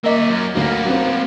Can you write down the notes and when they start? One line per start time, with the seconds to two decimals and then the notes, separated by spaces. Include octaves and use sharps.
0.04 A#3 A#4 D#5 E5 D6
0.28 F#2
0.55 D2 F#3 A#3 B3
0.85 F#3 C4